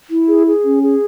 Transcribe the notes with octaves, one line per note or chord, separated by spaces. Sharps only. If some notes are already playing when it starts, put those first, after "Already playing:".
E4
G#4
G#4
C#4
G#4